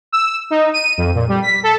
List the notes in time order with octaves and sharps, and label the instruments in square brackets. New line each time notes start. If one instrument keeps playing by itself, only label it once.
[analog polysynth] E6
D#4
D#7
F2
A#2
G3
B6
A4